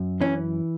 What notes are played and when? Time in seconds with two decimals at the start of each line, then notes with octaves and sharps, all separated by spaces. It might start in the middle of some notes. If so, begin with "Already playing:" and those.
Already playing: F#2
0.21 E3 C#4